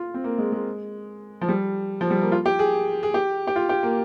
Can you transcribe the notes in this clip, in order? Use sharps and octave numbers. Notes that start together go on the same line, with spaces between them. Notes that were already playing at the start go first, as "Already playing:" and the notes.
Already playing: F4
C4
A#3
G#3
G#3
F3
G3
F3
G3
A#3
F4
G4
G#4
G#4
G4
G4
F4
G4
A#3